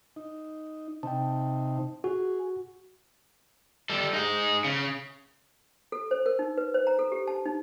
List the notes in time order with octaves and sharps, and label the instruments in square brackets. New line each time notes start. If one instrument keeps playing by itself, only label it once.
[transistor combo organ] D#4
[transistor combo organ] C3 D#4 [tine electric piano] G5 A5
[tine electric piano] F#4 [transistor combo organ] G#4
[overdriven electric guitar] G3 A4
D#4 G#4
C#3
[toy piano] A4
C5
A#4
D#4
B4
C5
A#5
A4
G4
A5
D#4